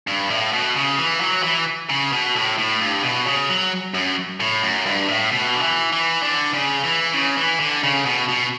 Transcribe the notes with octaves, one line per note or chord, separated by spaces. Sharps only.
G2
A2
B2
C#3
E3
F#3
E3
C#3
B2
A2
A2
G2
B2
C#3
F#3
F#2
A2
F#2
G2
A2
B2
D3
E3
E3
D3
C#3
E3
C#3
E3
D3
C#3
B2
B2